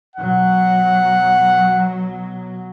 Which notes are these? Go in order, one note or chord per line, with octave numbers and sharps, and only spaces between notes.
B2 F#3 F#5